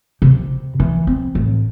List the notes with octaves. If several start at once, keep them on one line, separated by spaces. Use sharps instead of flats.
C3
E3
C4
A1